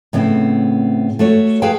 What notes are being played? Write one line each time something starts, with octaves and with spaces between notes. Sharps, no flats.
A2 C#3 B3 C4
A3 F#4 C#5
G#4 B4 F5 G5 A5